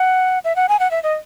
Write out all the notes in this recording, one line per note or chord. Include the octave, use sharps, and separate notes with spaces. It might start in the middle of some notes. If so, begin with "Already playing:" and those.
Already playing: F#5
E5
F#5
G#5
F#5
E5
D#5